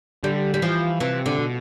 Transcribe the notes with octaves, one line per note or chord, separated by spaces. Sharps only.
D3 G3
G3
E3 F3
C3 E3
D3
B2